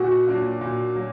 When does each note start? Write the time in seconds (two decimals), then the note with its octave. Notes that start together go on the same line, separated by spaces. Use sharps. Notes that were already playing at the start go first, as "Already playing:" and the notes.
Already playing: A#2 F#4
0.27 F#3 A#3 D4 F4
0.61 A#2
0.96 F#3 A#3